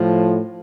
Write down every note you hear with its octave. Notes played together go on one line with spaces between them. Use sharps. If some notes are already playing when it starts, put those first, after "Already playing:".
Already playing: A2 F3